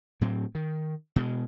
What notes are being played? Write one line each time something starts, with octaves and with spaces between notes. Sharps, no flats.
A2 F#3 C4
D#3
B2 G#3